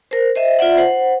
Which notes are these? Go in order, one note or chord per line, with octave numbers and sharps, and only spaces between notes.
A#4 C5
C5 D#5 E5
F4 D5 E5 F#5
C5 F#5